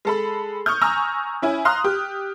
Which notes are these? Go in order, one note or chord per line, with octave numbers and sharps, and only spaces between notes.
G#3 A4 B5
C#6 D#6 F6 G6
G#5 A#5 C#6 E6 F6
C#4 E4 G#5
F5 A#5 C6 D#6 F6 F#6
G4